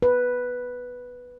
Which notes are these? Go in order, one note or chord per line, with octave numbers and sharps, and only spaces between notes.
B4